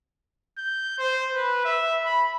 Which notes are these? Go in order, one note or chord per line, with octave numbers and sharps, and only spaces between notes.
G6
C5
B4
E5
B5